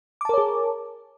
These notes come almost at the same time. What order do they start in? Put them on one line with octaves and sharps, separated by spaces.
D6 A5 A#4 C#5 G#4